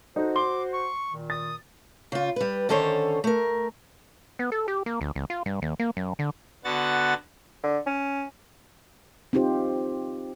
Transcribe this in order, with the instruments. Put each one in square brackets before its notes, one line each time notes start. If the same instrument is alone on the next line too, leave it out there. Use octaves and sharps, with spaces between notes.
[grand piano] D#4 A4 [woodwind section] F#4 C5
[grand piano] C6 G7 [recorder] D6
[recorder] C#6
[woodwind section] A#2 D#3
[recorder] D#6 [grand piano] A6
[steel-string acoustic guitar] C#3 F4
G3 B4
D3 D#3 C#4 A4 C5 C#5
A3 A#4
[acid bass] B3
A4
G4
A#3
D2
C#2
F4
G2
D#2
A#3
F#2
D3
[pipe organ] D3 B3 F#4 F#5 A6
[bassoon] D3
C#4
[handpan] C4 D#4 F4 G4 C5